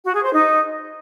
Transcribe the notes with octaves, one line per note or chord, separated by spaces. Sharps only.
F#4
G#4
C5
D#4